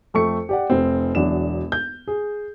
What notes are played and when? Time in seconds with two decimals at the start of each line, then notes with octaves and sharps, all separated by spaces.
0.14 F2 A3 C#6 C#7
0.49 G4 D5 F#5
0.70 F1 C4
1.15 E1 E2 F#3 D4 E7
1.72 G6
2.08 G#4